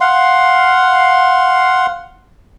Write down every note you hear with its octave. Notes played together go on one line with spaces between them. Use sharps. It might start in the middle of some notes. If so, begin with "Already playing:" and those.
F5 F#5 C6